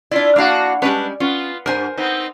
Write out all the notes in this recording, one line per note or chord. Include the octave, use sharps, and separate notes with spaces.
D4 E4 F4 D5
A#3 D4 E4 F#4 F5
G3 G#3 C#4 D4 B4
B3 C#4 F4
G2 A#4 C5 G#5
B3 C4 D#4